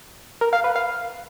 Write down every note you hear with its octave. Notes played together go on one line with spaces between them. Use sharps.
A#4
F5
B4
F5